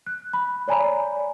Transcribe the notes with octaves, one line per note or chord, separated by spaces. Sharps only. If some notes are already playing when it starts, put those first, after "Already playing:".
F#6
B5
C#5 D5 G#5 A#5 B5